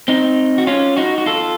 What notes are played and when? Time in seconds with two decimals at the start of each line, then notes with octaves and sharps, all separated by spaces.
0.08 C4 D#4
0.58 F#4
0.67 C#4 F4
0.97 D#4 F#4
1.18 F#4
1.26 F4 A4